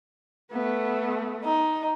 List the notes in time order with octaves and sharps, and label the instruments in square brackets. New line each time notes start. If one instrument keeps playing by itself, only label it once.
[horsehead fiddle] A3 B3
[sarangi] D#4